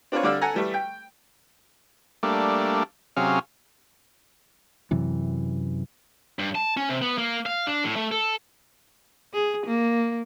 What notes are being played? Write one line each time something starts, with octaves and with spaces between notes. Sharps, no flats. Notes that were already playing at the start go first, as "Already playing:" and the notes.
C4 D4 F4 B4 C#5
D3 G3 D4 D5 F5 E6
A4 F#5 G#5 A#5
E3 G3 A3
G5
G3 A3 A#3 D4
C3 F#3 C#4 G#4 F5
F#2 C3 E3
G2
A5
C#4
C3
B3
A#3
F5
D4
A2
A3
A4
G#4
A#3